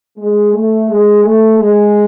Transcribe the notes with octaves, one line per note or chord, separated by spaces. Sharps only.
G#3
A3
G#3
A3
G#3